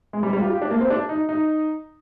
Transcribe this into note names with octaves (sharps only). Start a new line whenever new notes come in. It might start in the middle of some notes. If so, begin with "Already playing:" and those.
G#3
G3
G3
F4
G4
D4
A#3
C4
D4
D#4
D#4